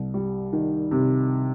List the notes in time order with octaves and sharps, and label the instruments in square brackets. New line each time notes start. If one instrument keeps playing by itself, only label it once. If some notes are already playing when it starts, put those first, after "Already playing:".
Already playing: [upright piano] C2
G3
D#3
C3